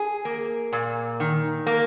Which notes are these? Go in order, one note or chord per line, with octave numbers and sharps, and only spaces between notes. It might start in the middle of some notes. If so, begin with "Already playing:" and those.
Already playing: G#4
A#3
A#2
D#3
A#3